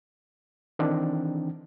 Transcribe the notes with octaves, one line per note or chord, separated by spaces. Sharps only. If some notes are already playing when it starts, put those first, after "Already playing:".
D#3 E3 C4 D4